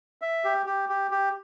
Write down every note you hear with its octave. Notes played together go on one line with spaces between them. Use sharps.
E5
G4
G4
G4
G4